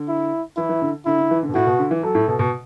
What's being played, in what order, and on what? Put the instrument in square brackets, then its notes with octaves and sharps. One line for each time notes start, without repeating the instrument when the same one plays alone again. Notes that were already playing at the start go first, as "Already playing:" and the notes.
Already playing: [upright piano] D3
[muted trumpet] E4
[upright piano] E3 [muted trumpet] E4
[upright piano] E3
D3
[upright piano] D3 [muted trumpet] E4
[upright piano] D3
E3
D3
B2
[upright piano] A2 [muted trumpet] F#4
[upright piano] B2
D3
E3
[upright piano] F#3 [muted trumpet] A4
[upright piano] A2
B2
B2